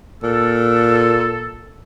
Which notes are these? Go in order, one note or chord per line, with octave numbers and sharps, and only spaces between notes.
A#2 A4